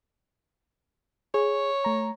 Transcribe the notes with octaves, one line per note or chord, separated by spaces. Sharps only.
G#4 C#5
A3 A#5